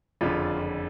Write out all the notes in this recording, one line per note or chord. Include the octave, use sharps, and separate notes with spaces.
F#1 F2 D3 F4